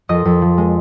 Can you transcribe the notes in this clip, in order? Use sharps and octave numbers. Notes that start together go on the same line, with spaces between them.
F2 D#5
F2
F3
G#3